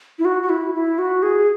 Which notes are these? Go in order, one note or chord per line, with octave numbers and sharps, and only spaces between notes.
E4
F#4
F#4
E4
E4
F#4
G#4